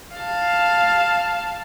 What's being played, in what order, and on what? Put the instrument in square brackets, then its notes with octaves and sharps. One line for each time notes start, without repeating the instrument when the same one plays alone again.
[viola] F5 A5